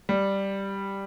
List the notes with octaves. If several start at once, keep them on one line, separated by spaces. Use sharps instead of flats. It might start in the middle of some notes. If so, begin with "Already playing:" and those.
G3